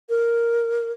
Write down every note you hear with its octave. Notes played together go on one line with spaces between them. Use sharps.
A#4